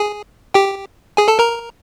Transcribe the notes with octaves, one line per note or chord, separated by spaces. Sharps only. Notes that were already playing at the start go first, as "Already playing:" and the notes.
Already playing: G#4 G#5
G4 G5
G#4 G#5
A4 A5
A#4 A#5